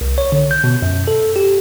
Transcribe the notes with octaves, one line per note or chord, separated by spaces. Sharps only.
C2
C#5
D3
G6
B2
F#2
A4
G4